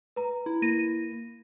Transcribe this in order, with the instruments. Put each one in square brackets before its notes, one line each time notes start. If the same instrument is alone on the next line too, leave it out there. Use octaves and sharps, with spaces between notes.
[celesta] B4 A#5
[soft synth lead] E4
[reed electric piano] A#3 [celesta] A#6 D#7